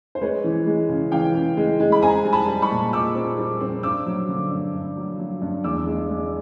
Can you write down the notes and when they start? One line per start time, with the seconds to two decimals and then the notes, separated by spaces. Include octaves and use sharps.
0.15 C5
0.21 G#3 B4 C#5
0.44 E3
0.67 G#3
0.89 C#3
1.12 E3 F5 G5
1.34 C#3
1.57 G#3
1.80 G#3
1.92 B5
2.02 C4 G#5 A#5
2.25 G3
2.33 A5 B5
2.47 G3
2.62 B5 C#6
2.70 A#2
2.93 A#2 D6 E6
3.15 C4
3.38 G3
3.61 C4
3.83 G2 D6 E6
4.06 F#3
4.29 D3
4.51 G2
4.74 G2
4.97 F#3
5.19 F#3
5.42 G2
5.64 E2 D6 E6
5.87 G#3
6.10 G#3